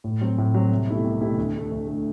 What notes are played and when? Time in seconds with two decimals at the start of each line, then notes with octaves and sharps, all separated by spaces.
0.04 A2
0.21 F#3 C4
0.38 A2
0.54 F#3 C4
0.71 C2
0.88 B2 A3 E4 G4
1.04 C2
1.21 B2 A3 E4 G4
1.37 D2
1.54 D3 A3
1.71 D2
1.87 D3 A3